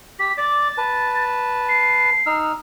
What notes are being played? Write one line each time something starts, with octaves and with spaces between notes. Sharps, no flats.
G4 B6
D5 D6 A6
B4 A5
C7
D#4 E6 F6